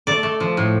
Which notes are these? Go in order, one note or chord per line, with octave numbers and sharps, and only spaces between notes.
A3 D5
A3
F3
A2